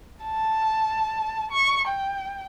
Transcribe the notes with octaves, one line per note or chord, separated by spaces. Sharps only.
A5
C#6
G5